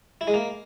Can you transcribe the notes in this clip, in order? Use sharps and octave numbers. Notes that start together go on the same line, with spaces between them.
E4
G#3
A#3